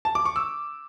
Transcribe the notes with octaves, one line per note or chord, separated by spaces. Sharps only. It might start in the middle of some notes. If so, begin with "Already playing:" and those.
A5
D6
C#6
E6